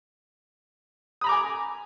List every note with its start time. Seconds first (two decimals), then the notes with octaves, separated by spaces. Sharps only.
1.21 D#6
1.24 B5
1.26 A#5
1.29 D6
1.32 G#5